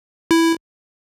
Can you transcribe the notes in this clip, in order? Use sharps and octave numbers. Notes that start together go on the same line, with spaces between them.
E4